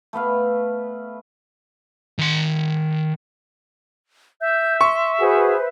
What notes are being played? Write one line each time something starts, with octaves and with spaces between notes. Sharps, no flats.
A3 B3 B4 F5
D#3 C6
E5 G6
C6 C#6
F#4 G#4 B4 C5